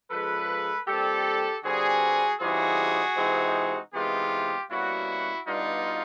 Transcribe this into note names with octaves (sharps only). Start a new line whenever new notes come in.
C#3 F3 G#3 A4 B4
A#2 G3 C4 G4 A4
G2 D3 G3 C4 F#4 G#4
C#3 E3 G3 C4 D#4 F#4 G#4
C3 E3 G#3 C4 D#4
C3 E3 G#3 B3 D#4 F4 G4
B2 G3 A#3 C#4 E4 F#4
B2 G3 B3 D4 D#4 F4